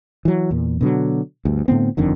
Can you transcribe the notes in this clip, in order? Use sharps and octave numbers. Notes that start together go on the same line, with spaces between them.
E3 F#3
E2 A#2
B2 D3 F#3
D2 G2
A2 D3 B3 C4
G1 F2 D3 D#3